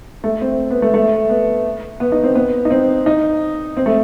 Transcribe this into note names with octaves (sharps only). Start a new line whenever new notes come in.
A3
C4
B3
A3
A3
B3
B3
D#4
C4
B3
D#4
C4
D#4
C4
A3